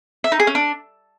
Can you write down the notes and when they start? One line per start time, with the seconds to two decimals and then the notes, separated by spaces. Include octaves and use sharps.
0.24 E5
0.32 D#4
0.40 G#4
0.47 C#4
0.55 D4